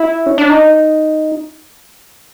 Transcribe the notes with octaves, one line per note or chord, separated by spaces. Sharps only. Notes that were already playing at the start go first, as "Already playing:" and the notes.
Already playing: E4
C#4
D4
D#4